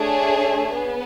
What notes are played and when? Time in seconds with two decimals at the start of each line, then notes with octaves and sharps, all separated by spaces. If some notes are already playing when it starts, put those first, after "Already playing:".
Already playing: A3 D4 G#4 C#5
0.75 B3